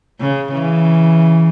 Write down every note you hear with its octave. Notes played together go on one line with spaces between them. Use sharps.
C#3
C#3 E3